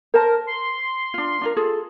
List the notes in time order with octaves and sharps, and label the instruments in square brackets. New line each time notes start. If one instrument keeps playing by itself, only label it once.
[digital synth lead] A#4 [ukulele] C5 A5
[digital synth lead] C6
[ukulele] D4 F4
D4 F4 A#4
F4 G#4 A4